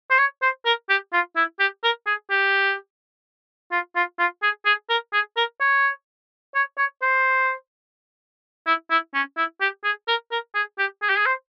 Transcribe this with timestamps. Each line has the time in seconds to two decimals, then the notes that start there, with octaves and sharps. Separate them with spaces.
0.10 C5
0.18 C#5
0.42 C5
0.66 A#4
0.89 G4
1.13 F4
1.36 E4
1.60 G4
1.84 A#4
2.07 G#4
2.31 G4
3.72 F4
3.96 F4
4.19 F4
4.43 G#4
4.65 G#4
4.90 A#4
5.13 G#4
5.37 A#4
5.61 C#5
6.55 C#5
6.78 C#5
7.02 C5
8.66 E4
8.90 E4
9.14 C#4
9.37 E4
9.61 G4
9.84 G#4
10.08 A#4
10.31 A#4
10.55 G#4
10.79 G4
11.02 G#4
11.10 G4
11.18 G#4
11.26 C5